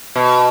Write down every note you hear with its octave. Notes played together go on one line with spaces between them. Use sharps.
B2